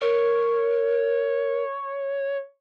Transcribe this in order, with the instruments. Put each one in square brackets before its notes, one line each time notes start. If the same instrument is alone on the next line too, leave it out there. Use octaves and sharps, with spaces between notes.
[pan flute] A#4 [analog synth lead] C#5